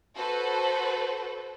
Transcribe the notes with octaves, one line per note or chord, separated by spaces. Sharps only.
F#4 A4 B4 C5